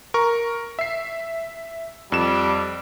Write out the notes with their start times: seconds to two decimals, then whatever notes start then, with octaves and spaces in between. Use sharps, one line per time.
0.14 A#4 C#6
0.79 E5 C7
2.12 F2 G3 E7